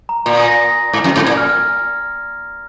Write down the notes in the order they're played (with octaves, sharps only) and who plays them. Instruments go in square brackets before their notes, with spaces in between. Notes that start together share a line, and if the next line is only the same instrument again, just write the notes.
[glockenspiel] A#5
[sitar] A#2 [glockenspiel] C6
[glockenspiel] D#6
A#6
[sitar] G#2
F2
G#2
[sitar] A#2 [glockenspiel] G#6
[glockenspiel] F6
F6